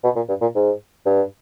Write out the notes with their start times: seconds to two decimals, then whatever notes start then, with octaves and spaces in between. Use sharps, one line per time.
0.04 B2
0.16 A#2
0.29 G2
0.42 A#2
0.56 G#2
1.06 G2